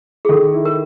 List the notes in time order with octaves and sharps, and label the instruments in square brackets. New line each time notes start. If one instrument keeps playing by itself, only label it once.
[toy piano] G#4
[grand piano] D#3 [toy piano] A4
[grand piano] E4
[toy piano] A#4